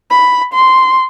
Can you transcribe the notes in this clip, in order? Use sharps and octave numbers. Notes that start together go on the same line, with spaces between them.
B5
C6